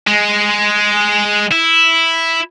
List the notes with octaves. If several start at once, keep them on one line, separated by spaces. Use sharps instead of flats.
G#3
E4